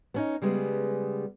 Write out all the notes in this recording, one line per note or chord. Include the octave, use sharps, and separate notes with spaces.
B3 C#4 D#4
C#3 G3 G#3 B3